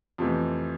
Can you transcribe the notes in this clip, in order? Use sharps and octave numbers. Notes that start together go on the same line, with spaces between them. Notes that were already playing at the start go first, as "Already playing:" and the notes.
F2 C3 E3 A3